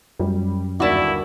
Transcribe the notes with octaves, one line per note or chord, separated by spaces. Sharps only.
F#2 G3
G1 D#2 E4 F#4 D5 A5